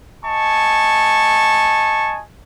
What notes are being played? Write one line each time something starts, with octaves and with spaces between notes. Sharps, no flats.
D#5 G#5 A5 C#6